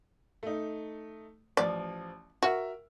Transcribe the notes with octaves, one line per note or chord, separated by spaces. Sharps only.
A3 D#4
A1 F3 D5
F#4 A#4 E5